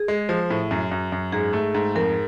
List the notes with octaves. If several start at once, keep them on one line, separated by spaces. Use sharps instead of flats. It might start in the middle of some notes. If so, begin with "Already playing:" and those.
Already playing: G#4
G#3
F3
A2
F#2
F#2
F#2
G#2 G#4
A3
G#2
F2 A#4